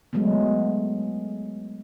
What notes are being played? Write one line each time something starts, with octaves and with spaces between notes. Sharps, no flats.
F#3 G#3 A3 B3